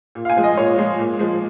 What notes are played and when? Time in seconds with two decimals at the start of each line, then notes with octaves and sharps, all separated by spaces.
0.15 A#2
0.25 F5
0.30 G#5
0.37 F3 G#3
0.43 D#5
0.57 A#2 C#5
0.77 F3 G#3
0.99 A#2
1.19 F3 G#3